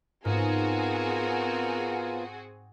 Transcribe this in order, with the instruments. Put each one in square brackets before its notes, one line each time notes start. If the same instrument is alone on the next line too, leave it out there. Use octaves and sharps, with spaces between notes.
[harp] G#2 [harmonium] B3 F4 [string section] C4 F#4 G#4 [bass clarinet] A#4